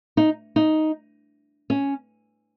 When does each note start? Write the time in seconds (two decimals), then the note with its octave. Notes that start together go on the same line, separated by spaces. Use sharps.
0.17 D#4
0.56 D#4
1.70 C#4